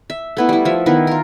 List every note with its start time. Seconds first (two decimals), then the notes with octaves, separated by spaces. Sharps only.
0.10 E5
0.37 A3 B3 E4
0.49 G3 E4
0.65 F3 E5
0.86 D#3 B3 E4
1.07 F4 A#4